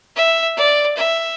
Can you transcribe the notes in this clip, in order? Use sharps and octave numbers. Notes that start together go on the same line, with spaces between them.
E5
D5
E5